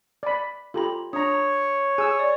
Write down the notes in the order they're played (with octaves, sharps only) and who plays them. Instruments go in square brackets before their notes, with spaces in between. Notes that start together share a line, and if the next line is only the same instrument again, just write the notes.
[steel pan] D5 B5
[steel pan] F4 G4 A#5 [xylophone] A4 B5
[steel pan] D4 A#5 [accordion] C#5 [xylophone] D#6
[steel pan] G#4 E6 [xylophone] G#5
[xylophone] D5